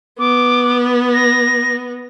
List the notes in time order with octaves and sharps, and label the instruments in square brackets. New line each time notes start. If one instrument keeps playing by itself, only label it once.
[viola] B3 [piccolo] D6
[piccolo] A#6